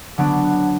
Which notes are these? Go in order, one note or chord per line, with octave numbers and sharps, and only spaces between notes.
D3 F#3 B3 D4